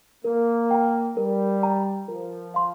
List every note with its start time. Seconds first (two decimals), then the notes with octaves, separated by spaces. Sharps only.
0.24 A#3 A#4
0.71 G5 A#5
1.17 G3 A#4
1.63 G5 A#5
2.08 F3 A#4
2.54 F5 C6